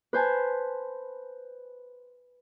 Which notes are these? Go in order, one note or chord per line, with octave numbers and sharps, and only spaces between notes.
B4 C5 G#5 A5